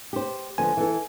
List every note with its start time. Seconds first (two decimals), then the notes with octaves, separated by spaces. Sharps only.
0.13 G4 C5
0.58 D3 F3 B3 G#5
0.77 E3 A4